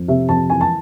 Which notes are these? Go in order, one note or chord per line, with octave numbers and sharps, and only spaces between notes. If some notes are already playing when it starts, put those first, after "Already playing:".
Already playing: F2
C3 E5
F2 A5
E3 G#5
A5